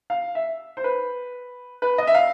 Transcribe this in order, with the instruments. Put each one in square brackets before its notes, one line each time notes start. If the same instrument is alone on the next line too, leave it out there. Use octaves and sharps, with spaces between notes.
[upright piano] F5
E5
C5
B4
B4
D#5
E5
F5